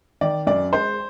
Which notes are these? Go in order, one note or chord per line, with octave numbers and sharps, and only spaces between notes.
D#3 D5
F#2 D5
G#3 C5